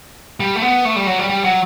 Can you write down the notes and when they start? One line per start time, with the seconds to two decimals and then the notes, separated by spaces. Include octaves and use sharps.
0.40 G3
0.56 A3
0.62 B3
0.85 A3
0.96 G3
1.07 F#3
1.19 G3
1.30 G3
1.44 F#3